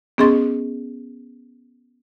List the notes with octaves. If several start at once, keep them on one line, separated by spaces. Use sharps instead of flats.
B3 C#4 G#4 D#5 C6 A6